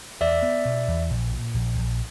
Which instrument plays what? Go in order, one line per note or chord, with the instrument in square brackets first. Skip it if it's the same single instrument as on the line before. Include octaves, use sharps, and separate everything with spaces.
[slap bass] E2 [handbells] D5 E5
[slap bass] B3
B2
E2
A#1
A#2
A#1
A#1